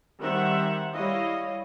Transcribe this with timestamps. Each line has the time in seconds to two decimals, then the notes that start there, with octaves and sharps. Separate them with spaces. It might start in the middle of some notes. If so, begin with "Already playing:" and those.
0.20 D#3 G3 C4 E5 F#5
0.95 G3 E4 C#5 D#5 F5